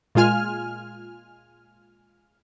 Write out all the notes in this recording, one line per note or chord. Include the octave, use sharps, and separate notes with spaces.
A#2 G#3 F4 G#5 F6